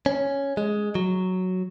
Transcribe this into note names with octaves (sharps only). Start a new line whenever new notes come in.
C#4
G#3
F#3